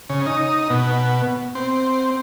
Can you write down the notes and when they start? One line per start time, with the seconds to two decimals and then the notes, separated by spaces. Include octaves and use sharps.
0.10 C#3
0.26 D#4
0.70 B2
1.55 C4